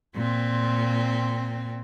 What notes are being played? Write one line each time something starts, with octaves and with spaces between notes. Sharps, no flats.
A#2 C4